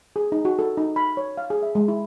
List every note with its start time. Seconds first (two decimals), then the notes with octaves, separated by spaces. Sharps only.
0.16 G#4
0.32 D#4
0.45 F#4
0.59 A4
0.77 D#4
0.96 B5
1.17 C#5
1.37 F5
1.50 G#4
1.63 E5
1.75 G#3
1.88 E4